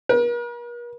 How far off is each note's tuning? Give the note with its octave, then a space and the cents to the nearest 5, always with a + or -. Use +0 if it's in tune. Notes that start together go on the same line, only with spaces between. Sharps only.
A#4 +45